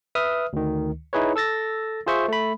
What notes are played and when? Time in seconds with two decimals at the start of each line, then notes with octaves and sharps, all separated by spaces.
0.15 B4 E5 D#6 F6
0.53 D2 D#3
1.13 D#4 E4 G#4 B4 C#5
1.36 A4 E6 A6 A#6
2.06 F4 G#4 C5 E5 C#6
2.28 A3 B5